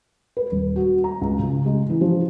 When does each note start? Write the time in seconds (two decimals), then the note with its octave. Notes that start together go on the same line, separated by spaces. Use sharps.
0.37 B4
0.52 D#1
0.76 F#4
1.04 A#5
1.21 C#2
1.39 C#3
1.66 G#3
1.90 E3
2.01 F3